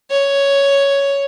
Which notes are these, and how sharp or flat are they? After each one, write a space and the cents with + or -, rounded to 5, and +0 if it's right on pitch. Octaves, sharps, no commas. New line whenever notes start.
C#5 +5